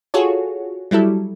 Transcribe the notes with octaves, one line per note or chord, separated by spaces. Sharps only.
F4 F#4 G#4 A4 C#5
F#3 G3 E4 A4